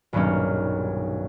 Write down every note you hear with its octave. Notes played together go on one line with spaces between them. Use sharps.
D#1 B1 G2 A#3 C#4